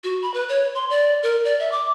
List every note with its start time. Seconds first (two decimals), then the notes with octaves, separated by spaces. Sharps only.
0.04 F#4
0.22 B5
0.34 B4
0.49 C#5
0.75 C6
0.90 D5
1.23 A#4
1.45 D5
1.59 E5
1.72 D6